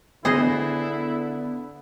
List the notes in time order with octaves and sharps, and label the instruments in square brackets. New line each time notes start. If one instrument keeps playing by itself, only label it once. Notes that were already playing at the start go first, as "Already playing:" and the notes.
[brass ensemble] D3 [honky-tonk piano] B3 [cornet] E4 [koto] G#4 C5 D#5